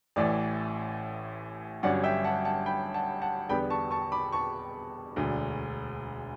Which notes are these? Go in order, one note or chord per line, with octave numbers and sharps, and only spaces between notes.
A1 A2 E3 D5
G1 G2 F#3 C#4 D5 F#5
E5 G5
F#5 A5
F#5 A5
G5 B5
F#5 A5
F#5 A5
E2 D3 G3 B3 G5 B5
A5 C#6
A5 C#6
B5 D6
A5 C#6
E1 D2 D3